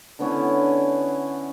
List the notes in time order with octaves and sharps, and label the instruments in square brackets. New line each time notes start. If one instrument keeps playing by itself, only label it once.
[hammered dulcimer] D3 B3 C#4 E4